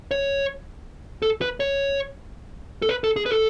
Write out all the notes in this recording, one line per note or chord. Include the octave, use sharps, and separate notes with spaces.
C#5
A4
B4
C#5
A4
B4
A4
G#4
B4
A4